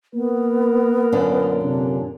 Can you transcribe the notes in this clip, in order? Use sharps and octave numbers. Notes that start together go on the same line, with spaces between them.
A#3 B3 A#4
F#2 A#2 D3
C3 D4